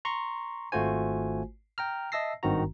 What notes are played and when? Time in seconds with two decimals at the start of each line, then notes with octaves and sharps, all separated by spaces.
0.05 A#5 C6 C#6
0.72 G#1 A3 F4 F#4 C5 G#5
1.78 G5 A#5 F6
2.12 D#5 E5 A5 E6 A#6 C7
2.43 G#1 G2 D#3 C4 F#4 A#5